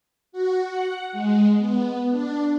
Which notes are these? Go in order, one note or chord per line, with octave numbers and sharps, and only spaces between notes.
F#4
F#5
G#3
B3
D4